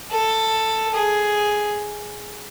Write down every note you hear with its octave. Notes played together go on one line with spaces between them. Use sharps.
A4
G#4